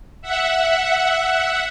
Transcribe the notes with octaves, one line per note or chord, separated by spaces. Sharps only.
E5 F#5